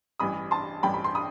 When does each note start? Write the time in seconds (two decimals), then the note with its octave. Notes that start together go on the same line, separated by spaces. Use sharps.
0.19 A1 G2 E3 B5 D#6
0.51 A5 C6
0.83 A1 G2 E3 G5 B5
0.94 B5
1.04 C6
1.15 B5 D#6